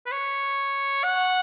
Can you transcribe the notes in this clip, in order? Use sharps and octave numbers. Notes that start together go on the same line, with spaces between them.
B4
C#5
F#5